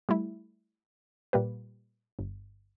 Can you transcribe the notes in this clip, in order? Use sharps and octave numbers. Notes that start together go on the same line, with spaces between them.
G3 A3 E4
A#2 G3 A#3 G4 B4
G1